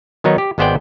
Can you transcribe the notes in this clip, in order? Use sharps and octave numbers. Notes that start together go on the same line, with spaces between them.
D#3 F#3 B3 D#4 C#5
G4
G#1 G#3 B3 C5 D5 G5